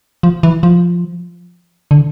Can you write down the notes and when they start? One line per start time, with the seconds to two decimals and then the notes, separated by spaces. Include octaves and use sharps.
0.23 F3
0.43 E3
0.63 F3
1.91 D3